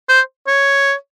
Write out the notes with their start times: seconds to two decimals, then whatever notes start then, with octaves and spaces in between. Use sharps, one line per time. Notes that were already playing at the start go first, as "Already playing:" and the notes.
0.09 C5
0.47 C#5